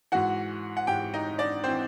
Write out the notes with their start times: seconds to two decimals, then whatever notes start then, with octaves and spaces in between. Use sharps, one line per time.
0.12 G#2 E3 F#4 F#5
0.77 F#5
0.87 G#2 E3 G4 G5
1.14 D#4 D#5
1.38 D4 D5
1.64 E3 C4 C5